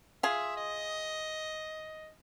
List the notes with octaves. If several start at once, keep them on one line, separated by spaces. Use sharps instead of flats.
F4 G#4 E5
D#5